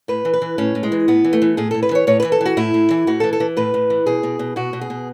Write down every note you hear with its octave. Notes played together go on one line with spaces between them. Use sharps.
A2 B4
E3
B4
E3
A2 C#4
A2
G#3
E3
A2 B3
E3
A3
E3
A2 G#4
A2 A4
B4
E3 C#5
A2 C#5
E3 B4
A4
E3 F#4
A2 E4
A2
E3
A2 F#4
E3 A4
A4
E3
A2 B4
A2
E3
B2 G#4
B2
B2
B2 F#4
B2
G#4
B2